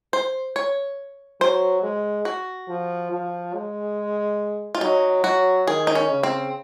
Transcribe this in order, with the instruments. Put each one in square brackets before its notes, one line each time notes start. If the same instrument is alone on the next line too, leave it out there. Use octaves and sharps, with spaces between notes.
[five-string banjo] C5
C#5
[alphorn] F#3 [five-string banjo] C5
[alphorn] G#3
[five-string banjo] F#4
[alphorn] F3
F3
G#3
[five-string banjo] F4
[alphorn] F#3 [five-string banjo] D#4
[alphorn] F#3 [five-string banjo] F#4
[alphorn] D#3 [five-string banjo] G#4
[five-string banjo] D#4
C#4
[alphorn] C#3
[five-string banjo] C4